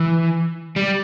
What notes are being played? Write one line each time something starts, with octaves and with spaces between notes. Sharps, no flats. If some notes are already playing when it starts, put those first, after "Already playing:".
Already playing: E3
G3